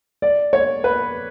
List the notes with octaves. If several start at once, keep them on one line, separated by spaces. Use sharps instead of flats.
D5
C#5
B4